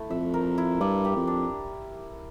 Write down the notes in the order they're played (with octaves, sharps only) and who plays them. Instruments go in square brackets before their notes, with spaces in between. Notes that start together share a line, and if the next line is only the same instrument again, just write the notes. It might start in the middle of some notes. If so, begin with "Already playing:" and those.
Already playing: [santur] A3 E4
[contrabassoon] F2 [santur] E5
[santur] A#4
E4
[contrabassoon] G2 [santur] D5
[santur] G4
[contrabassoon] F2
[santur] D4